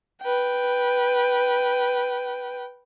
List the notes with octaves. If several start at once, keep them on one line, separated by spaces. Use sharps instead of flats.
B4 G5